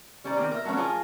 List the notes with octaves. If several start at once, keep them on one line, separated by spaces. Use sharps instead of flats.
G3 C#4 C5 D5 A#5
D#3 A#3 C4
A#4 E5
F#3 A3 B3 C#4 D4
F3 F4 G#4 A#4 F5 G#5